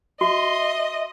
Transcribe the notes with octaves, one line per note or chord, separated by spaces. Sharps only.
F#4 D#5 E5 C6